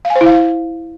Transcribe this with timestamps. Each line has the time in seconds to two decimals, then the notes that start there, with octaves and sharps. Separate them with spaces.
0.05 F5
0.10 G#5
0.16 C5
0.21 E4
0.26 F5